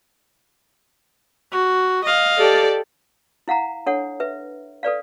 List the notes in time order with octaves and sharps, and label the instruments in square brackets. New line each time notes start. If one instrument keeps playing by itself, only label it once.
[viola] F#4
D#5 F5
[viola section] G4 A4 D5
[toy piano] E4 F5 F#5 A#5
D4 A4 C#5 F#5
B4 E5
A4 B4 D5 F5